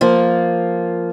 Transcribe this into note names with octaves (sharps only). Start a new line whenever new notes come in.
F3 A#3 F4